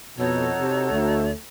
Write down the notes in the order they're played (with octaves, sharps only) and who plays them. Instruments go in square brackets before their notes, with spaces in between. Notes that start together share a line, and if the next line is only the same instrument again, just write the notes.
[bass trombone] F2 [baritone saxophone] B2 [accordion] D#4 F#4 A4 [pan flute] C#5
[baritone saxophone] C3
[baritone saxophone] D2 [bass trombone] A3